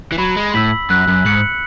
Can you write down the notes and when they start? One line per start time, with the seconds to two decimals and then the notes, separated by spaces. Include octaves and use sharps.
0.12 E3
0.18 F#3 B5
0.36 G#3
0.54 A2 E6 B6 F#7
0.90 F#2 F#6
1.08 F#2
1.25 G#2 C#7 F#7